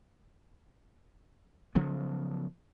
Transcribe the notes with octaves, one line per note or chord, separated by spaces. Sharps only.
C#3 F3 F#3 B3